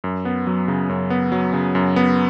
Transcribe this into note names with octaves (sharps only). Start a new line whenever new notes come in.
F#2
B3
F#3
C#3
F#2
B3
F#3
C#3
F#2
B3